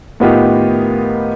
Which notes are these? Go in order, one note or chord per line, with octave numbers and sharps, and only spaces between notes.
A2 D#3 B3 D#4 F4 G4